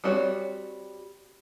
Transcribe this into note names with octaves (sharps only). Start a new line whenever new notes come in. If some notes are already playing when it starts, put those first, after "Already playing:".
G3 C4 F#4 B4 C#5